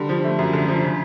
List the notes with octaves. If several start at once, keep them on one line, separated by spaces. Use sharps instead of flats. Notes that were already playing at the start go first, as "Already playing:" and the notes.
Already playing: D3 G3
F3
A3
F#2
D3
F3
C#3